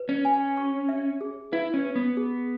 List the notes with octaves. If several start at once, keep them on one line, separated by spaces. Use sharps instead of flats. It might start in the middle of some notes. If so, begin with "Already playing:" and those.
Already playing: B4
C#4
G#5
C#6
E5
G#4
E4 B4
C#4
B4
B3
G#4